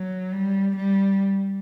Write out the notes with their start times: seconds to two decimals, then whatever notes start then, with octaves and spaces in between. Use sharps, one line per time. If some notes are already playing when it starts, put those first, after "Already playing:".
Already playing: F#3
0.32 G3
0.77 G3